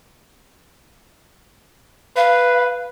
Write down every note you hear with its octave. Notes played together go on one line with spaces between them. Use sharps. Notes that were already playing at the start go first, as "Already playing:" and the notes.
B4 F5